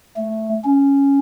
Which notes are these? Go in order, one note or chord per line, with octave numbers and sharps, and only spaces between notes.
A3
C#4